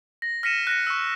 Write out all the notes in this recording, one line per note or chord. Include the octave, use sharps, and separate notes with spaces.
A#6
F6 A#6 B6 C#7 D#7 E7
F#6 A#6 C#7
C#6 E6